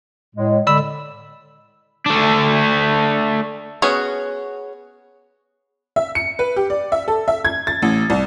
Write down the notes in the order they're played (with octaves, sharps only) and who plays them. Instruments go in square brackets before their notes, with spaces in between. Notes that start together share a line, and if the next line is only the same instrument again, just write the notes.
[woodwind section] A2 G#3
[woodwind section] D3 G#3 [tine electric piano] D5 B5 E6
[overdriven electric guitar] A3 D4
[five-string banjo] B3 C#4 F#4 G#4
[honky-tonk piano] E5
C#7
B4
G4
D5
E5
A4
E5
G#6
A6
A1
C2